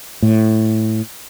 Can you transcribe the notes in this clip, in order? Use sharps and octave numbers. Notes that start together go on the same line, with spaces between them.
A2